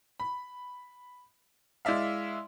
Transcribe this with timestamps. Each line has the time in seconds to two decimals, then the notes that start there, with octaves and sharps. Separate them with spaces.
0.20 B5
1.85 G#3 E4 D5 E5 F5